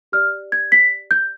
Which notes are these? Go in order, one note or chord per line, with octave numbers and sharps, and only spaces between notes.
G4 D5 F6
G#6
B6
G6